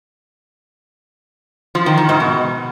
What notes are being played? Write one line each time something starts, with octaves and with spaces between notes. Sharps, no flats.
F3
D#3
D#3
G#2
B2